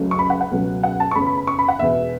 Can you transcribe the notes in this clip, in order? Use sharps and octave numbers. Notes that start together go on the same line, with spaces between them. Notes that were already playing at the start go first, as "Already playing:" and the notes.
Already playing: C#2 C#3 F#3 A3
C#6
B5
F#5
F#5
C#2 B2 F#3 A3
F#5
A5
C#6
E2 C#3 A3 B5
B5
B5
C#6
B5
F#5
E1 E2 B2 E5